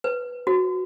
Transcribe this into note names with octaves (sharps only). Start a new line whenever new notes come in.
B4
F#4